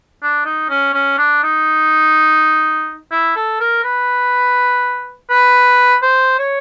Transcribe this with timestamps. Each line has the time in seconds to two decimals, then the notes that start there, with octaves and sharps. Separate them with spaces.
0.23 D4
0.46 D#4
0.70 C#4
0.94 C#4
1.18 D4
1.44 D#4
3.12 E4
3.36 A4
3.61 A#4
3.84 B4
5.30 B4
6.02 C5
6.39 C#5